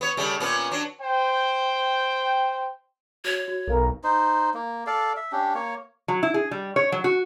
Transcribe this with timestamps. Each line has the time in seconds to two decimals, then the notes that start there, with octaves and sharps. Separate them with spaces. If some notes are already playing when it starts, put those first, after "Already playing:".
0.01 B3 C#5
0.17 C#3 G3 A3
0.40 A#2 B3 C#4
0.71 F#3 D4
1.00 C5 G5
3.25 F#4 C#5
3.48 F#4
3.68 B1 A4 A#4 F5 A#5
4.04 D#4 C5
4.54 A#3
4.87 A4 D5 F5
5.17 E5
5.32 C#4 D4 G4
5.54 A#3 C#5
6.08 F#3
6.23 E4
6.34 G#4
6.51 G3
6.76 C#5
6.92 F#3
7.04 F#4